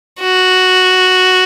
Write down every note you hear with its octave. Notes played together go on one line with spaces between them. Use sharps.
F#4